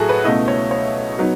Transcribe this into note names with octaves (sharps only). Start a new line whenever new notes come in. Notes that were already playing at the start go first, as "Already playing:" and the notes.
Already playing: A2 F#3 F#4 G#4 A4
B4
C#2 B2 A3 E4 D#5
C#5
C#5
F#3 B3 D#4